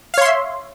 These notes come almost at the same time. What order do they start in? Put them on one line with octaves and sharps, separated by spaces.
F5 C#5 C6 E5